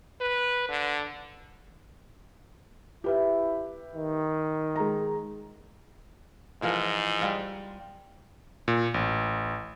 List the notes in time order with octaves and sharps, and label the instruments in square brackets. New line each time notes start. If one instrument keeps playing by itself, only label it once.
[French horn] B4
D3
[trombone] E4 [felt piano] G4 B4 E5
[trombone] D#3
[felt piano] G#3 A#5
[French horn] G#2 [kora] E3 F3 A#4
[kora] G3 F4
[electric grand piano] A#2
A1